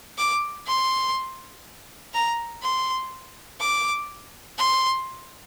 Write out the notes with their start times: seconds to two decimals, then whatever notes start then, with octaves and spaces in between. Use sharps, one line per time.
0.18 D6
0.67 C6
2.14 A#5
2.63 C6
3.60 D6
4.58 C6